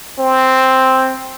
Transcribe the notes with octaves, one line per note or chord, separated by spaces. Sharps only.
C4